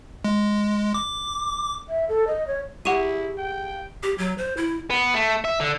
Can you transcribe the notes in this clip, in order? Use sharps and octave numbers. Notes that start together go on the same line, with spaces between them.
G#3
D6
E5
A4
D#5
C#5
E4 G4 G#4 F#5 C#6 D#7
G5
G4
F#3
C5
E4
B3
A3
E5
D3